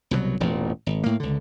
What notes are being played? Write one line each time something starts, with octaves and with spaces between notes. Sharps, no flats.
C2 B2 E3 F#3
E1 A1 A#2
G#1
A2 A#3
C#2 D3